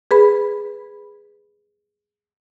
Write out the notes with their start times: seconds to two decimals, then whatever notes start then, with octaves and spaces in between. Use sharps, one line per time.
0.11 G#4 B4 B5